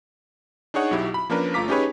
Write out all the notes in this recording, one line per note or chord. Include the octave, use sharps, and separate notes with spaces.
D4 D#4 G#4 C#5 F#5
B1 F#3 E4 G4
B5
F3 A#3 C#4 D4 A#4 B4
G1 A3 F4 A#5 D6 B6
C#4 D#4 G4 G#4 B4 C#5